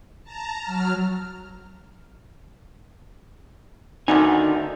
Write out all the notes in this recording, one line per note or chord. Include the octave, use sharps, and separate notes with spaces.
A5 A#5
F#3 F6
D2 D3 D#3 D#4 G#5